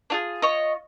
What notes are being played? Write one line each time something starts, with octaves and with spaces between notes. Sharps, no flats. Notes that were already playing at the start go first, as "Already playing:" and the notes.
D4 F4 G#4
C#5 D#5